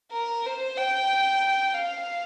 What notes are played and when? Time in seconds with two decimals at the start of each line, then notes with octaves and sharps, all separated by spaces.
0.13 A#4
0.46 C5
0.77 G5
1.74 F5